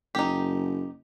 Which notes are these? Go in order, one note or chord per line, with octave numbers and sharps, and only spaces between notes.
F#1 D#4 G4